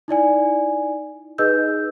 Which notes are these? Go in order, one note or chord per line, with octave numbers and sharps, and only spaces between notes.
D#4 E4 D5 G#5
D#4 G#4 B4 D#5 E6 G6